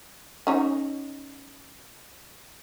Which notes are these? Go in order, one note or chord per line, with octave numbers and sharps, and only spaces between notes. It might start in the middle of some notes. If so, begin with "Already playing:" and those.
C#4 D#4 C#5